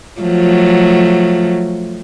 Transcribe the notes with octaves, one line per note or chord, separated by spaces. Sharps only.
F3 F#3 A3